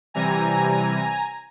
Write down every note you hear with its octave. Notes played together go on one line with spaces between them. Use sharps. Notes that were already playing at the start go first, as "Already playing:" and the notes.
C3 E3 G3 G#5 A#5